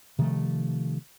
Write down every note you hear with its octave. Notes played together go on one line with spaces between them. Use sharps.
C3 D#3 F3 A3